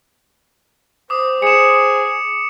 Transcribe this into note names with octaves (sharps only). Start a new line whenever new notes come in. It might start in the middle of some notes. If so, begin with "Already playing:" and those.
C5 D6 D#6
G#4 C#7 E7